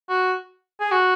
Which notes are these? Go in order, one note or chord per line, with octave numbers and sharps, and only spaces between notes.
F#4
G#4
F#4